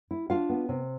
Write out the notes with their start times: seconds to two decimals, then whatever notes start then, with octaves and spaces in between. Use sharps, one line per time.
0.11 E4
0.30 D4 F4 F5
0.49 B3
0.69 C3